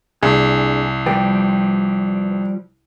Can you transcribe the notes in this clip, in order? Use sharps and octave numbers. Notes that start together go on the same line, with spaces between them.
C2 D4 G#4
F3 G3 G4 B4 G5